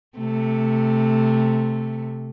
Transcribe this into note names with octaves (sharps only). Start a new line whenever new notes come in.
C3 A3